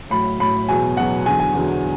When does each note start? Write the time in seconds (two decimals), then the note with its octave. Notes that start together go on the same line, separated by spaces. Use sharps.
0.10 A2 F#3 B5
0.40 A2 F#3 B5
0.69 E2 B2 F#3 G#5
0.97 E2 B2 F#3 F#5
1.26 E2 D3 F#3 G#5
1.40 G#5
1.55 E2 D3 F#3